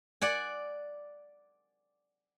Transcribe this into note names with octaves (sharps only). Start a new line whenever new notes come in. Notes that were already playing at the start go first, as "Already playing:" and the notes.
D5 F#5 G#5